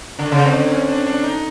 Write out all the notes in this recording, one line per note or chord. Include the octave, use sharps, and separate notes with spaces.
D3 D4
C#3 C#4
D3 C4
C#4
D4
D4
D#4